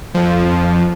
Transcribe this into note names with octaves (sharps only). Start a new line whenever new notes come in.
F2 F3